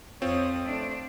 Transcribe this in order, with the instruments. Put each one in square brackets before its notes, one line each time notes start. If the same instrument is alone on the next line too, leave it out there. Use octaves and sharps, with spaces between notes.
[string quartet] F2 D#6 [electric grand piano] C4 F4 [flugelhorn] C#5
[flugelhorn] A3 [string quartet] D4